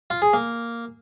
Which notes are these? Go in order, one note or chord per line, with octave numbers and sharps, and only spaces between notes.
F4
G#4
A#3